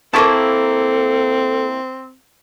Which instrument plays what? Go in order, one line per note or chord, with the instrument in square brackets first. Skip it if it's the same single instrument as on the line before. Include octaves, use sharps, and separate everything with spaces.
[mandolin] A#3 C#4 E4 [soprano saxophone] C4 [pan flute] A4 [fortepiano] A5 C#6